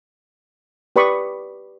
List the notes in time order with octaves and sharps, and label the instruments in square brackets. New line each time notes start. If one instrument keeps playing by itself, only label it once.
[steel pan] G4 B4 D5 B5 C#6 D#6